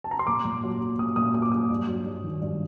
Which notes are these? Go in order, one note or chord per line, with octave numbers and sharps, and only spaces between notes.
A5
A#5
C6
A#2 D6
A#2
F#3
F#3
A#2 D#6
A#2 D#6
F#3 D#6
D6
F#3 D#6
G2
F#3
G2
D#3
G2